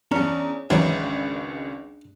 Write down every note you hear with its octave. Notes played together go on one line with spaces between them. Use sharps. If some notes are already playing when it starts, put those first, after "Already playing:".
E2 C#4 D4 C#5 A#5
G#1 C#2 E3 F#3 D4 D#4 B4 E5